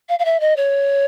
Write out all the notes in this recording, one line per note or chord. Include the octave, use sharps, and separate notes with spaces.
F5
F5
E5
D#5
C#5